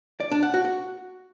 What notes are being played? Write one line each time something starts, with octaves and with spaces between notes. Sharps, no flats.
D5
D4
F#5
F#4
F#4